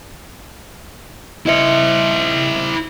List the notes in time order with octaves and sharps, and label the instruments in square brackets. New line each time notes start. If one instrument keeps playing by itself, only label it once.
[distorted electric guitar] E4 C5 [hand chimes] D#5 E5 C#7